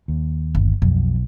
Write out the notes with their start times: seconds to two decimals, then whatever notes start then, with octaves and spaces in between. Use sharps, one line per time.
0.08 D#2
0.55 G1
0.82 B1 F2